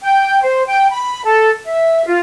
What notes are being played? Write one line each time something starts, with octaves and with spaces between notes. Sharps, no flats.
G5
C5
G5
B5
A4
E5
F4